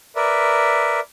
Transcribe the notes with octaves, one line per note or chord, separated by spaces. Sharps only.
A#4 B4 D5 E5